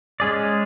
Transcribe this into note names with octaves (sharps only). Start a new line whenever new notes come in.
G#3 C#4 G#4 D5